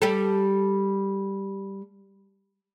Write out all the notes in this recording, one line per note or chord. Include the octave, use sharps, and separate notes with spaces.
G3 G4 A4